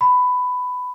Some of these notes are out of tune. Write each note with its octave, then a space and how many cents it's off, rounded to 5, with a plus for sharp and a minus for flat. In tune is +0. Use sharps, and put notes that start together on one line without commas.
B5 +15